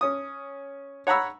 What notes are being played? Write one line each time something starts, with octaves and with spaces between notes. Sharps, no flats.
C#4 D#6
C#5 F#5 A#5 B5 E6